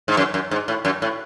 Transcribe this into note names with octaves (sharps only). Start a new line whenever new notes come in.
G#2
F#2
F#2
G#2
A2
F#2
A2